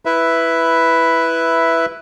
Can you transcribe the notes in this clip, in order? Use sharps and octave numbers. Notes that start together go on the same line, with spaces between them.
E4 B4 E5